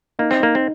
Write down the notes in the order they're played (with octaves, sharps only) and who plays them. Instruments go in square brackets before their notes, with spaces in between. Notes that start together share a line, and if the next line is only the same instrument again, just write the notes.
[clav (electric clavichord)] A#3 [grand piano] D#4
[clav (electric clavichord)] C4
[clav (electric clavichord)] A#3 [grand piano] D#4
[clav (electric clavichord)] C4